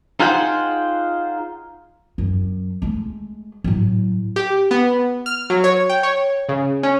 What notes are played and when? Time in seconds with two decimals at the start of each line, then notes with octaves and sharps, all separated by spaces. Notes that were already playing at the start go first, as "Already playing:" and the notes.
0.20 D#4 F4 G#4 C5 F#5 G5
2.18 F#2
2.82 G#3 A3
3.64 A2 F#3
4.36 G4
4.71 B3
5.26 F6
5.50 F#3
5.64 C#5
5.90 G5
6.03 C#5
6.49 C#3
6.83 C#4